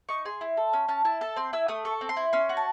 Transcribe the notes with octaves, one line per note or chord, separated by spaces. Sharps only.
D#4 C#6
G#4 C6
E4
A4
C#4
C#4 A5
E4 A5
A4 A5
C4 C6
E4 E6
A3 D#6
A4 C#6
C4
C6
E4
C#4 C6
F#4
A5